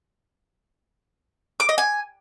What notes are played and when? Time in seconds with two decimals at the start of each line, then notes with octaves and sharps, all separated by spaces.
1.60 D6
1.69 D#5
1.78 G#5